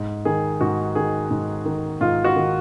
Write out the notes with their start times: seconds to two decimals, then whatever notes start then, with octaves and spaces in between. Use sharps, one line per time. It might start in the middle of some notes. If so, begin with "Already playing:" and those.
Already playing: G#2
0.25 D#3 G#4
0.61 G#2 F#4
0.95 D#3 G#4
1.31 G#2
1.65 D#3
2.01 G#2 F4
2.24 F#4
2.36 D#3